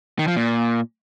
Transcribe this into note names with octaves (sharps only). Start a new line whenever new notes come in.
D#3
F3
A#2